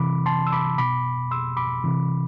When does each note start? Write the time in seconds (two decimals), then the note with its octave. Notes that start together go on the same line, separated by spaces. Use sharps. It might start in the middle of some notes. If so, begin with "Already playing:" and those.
Already playing: C3 E3 B5 D6
0.26 A5 C6
0.47 E6
0.52 B5 D6
0.78 B2 B5 D6
1.31 C6 E6
1.57 B5 D6
1.84 C3 E3